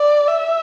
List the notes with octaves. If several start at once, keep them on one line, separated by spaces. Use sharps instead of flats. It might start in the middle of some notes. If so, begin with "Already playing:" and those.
Already playing: D5
E5